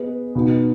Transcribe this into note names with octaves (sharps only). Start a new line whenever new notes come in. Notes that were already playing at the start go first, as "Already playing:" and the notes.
Already playing: B3 G#4 B4 D#5
B2 B3 D#4